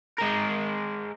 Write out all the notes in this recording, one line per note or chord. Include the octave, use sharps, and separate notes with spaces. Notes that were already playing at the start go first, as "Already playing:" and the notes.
G#3 A#4